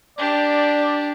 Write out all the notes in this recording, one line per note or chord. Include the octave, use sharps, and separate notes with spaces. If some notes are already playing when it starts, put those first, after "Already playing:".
D4 G4 D5